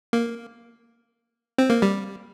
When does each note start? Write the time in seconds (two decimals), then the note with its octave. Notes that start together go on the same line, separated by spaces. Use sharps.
0.13 A#3
1.58 C4
1.70 A#3
1.82 G3